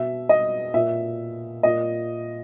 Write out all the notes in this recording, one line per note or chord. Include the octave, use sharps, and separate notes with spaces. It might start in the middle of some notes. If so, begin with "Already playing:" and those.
Already playing: B2 E5
D#5
A#2 E5
A#2 D#5